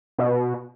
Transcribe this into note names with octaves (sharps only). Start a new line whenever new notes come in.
B2